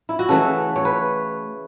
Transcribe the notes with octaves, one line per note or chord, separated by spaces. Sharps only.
E4
F#4
C#3 E3 A3 A4
C#5
B4